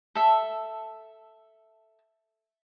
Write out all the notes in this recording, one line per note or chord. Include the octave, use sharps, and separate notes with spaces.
A4 E5